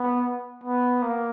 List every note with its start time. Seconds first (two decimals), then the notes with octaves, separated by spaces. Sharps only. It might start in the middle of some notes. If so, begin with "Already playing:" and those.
Already playing: B3
0.64 B3
1.02 A#3